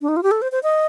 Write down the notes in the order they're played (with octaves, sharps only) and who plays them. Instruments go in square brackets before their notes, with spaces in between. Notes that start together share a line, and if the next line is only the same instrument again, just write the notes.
[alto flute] D4
D#4
F4
G4
A4
C5
C5
D#5